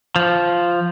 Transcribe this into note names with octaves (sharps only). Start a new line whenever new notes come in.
F3